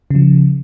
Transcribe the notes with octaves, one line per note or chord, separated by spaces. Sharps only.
C#3 F3